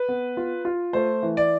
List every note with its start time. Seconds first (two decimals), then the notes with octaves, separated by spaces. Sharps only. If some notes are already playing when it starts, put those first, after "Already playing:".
Already playing: B4
0.09 B3
0.37 F4
0.65 F4
0.93 A3 C5
1.23 E3
1.37 D5